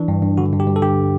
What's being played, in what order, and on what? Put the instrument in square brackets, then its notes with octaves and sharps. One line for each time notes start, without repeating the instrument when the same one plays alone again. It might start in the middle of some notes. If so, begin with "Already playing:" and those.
Already playing: [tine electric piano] E3 D4
G2
G2
D3 F#4
G2
G4
G2
A4
D3 G4